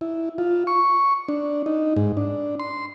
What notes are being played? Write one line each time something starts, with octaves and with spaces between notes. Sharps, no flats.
E4
F4
C#6
D4
D#4
G#2
D4
C6